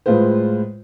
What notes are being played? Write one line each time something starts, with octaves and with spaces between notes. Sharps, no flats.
A2 G#3 F4 B4 C5